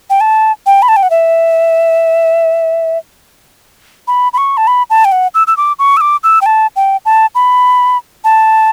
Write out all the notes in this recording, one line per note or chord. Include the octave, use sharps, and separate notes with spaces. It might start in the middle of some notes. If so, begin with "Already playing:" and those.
G5
A5
G5
B5
A5
G5
F#5
E5
B5
B5
C#6
A5
B5
A5
G5
F#5
E6
E6
D6
C#6
E6
D6
E6
G5
A5
G5
A5
B5
A5